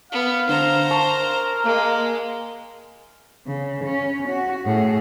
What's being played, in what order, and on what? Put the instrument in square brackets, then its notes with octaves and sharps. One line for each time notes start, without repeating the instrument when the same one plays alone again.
[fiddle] B3 [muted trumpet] F5
[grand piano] D3 [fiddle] C5 A#5
[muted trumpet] A#4 [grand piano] A5 C#6
[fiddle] G#3 [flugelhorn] A#3
[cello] C#3
C#4
F#4
A2 G#4